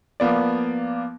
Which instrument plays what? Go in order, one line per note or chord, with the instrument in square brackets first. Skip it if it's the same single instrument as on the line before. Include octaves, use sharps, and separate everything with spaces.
[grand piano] F3 A#3 B3 D5